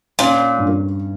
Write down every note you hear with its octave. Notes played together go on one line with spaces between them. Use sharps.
A#2 C#4
G2